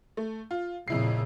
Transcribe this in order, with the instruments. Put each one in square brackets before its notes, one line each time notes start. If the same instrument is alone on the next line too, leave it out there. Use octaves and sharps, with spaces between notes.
[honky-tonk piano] A3
F4
[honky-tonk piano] F2 E4 C7 [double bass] A#2 C#3